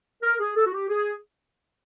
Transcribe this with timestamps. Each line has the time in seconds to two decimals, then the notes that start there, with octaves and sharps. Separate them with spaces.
0.23 A#4
0.39 G#4
0.56 A4
0.66 F#4
0.73 G4
0.89 G#4